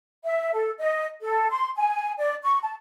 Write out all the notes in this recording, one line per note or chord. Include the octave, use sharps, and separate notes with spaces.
E5
A4
D#5
A4
C6
G#5
D5
C#6
A5